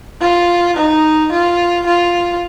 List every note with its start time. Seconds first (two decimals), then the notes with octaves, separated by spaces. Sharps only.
0.21 F4
0.77 D#4
1.32 F4
1.86 F4